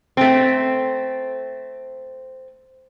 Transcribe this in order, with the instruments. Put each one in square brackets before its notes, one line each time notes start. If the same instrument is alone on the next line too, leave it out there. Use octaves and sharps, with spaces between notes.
[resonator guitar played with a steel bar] A3 C4